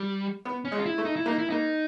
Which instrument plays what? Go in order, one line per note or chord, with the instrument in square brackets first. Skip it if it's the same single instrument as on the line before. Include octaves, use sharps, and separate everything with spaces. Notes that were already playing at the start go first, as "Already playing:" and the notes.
Already playing: [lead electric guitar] G3
[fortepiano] B3
[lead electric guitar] C#4
[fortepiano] G#3
[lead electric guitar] F4
E4
[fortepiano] A3
[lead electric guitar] D#4
E4
[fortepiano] A#3 [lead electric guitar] D#4
[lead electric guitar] E4
[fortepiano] A#3 [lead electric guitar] D#4